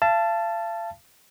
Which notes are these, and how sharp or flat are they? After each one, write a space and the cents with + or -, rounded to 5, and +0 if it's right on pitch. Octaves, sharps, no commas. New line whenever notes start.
F5 -40 A5 +0